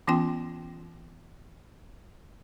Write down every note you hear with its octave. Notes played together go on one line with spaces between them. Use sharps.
E3 B3 C#4 F4 G5 C6